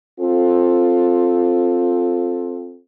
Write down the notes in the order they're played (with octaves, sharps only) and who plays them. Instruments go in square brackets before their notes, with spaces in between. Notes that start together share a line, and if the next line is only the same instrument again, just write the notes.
[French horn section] C4 F4 A4